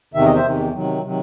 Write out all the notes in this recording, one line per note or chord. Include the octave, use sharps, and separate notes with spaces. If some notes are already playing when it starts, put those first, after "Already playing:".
E2 C3 D#3 E5
D#5
C5 E5
E2 C3 D#3
C3 D#3 F#3
C3 D#3 F#3